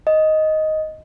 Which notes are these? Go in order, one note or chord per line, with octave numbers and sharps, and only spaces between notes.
D#5